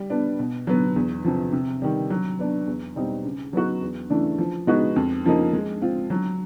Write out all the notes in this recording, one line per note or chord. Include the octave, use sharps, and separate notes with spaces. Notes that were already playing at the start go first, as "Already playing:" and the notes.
Already playing: G3
B3 D4
B2
F#3 B3
E2
C3 F3
C3
D#3 G3
F#3
B3 D4
E2
B2 G3 C4 D#4
C#3
F#3 B3 D#4 F#4
E2
C#3 E3 A3 D4
F3
G#3 B3 D#4 F#4
F2
C#3 F3 A#3 D#4
G#3
C4 F4
F#3